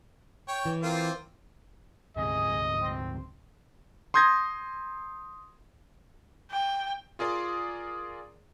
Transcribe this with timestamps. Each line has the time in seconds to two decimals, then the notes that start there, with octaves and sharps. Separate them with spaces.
0.48 C#5 G5
0.65 E3
0.83 A#3 C4 F4
2.17 D2 G#2 C3 G#4 D#5
2.80 C4
4.14 C6 D#6 G6 G#6 A#6
6.51 G5
7.19 F4 G#4 A#4 D5 C6